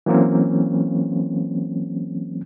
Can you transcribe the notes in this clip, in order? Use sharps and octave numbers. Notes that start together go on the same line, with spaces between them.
E3 F#3 A#3 C4 C#4